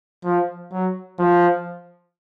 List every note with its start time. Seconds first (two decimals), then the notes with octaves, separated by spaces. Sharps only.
0.25 F3
0.72 F#3
1.19 F3